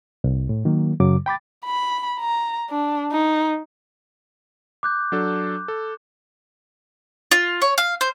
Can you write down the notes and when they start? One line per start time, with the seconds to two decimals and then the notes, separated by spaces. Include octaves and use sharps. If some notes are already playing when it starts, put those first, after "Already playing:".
0.24 C2
0.49 A2
0.65 D#3 F#3 A#3
1.00 F#2 C#3 F#3 D6
1.26 G5 B5 D6 A6
1.66 B5
2.20 A#5
2.70 D4
3.12 D#4
4.83 D6 F#6 G6
5.12 F#3 D4 A4
5.68 A4
7.31 F4
7.62 C#5
7.78 F5
8.01 C5